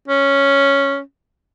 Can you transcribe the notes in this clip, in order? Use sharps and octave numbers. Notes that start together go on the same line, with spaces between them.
C#4